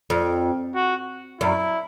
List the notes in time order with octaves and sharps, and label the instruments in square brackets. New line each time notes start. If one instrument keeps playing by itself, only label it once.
[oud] F2
[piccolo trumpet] F#4
[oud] F#2 [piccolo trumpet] E4